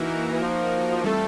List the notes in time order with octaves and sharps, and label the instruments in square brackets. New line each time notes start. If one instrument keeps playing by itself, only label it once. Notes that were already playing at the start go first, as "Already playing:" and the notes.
Already playing: [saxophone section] E3 [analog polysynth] A#3 D#4 F#4 A#4
[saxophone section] F3
[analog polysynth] E3 G3 C4 F4 A4 [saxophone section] A3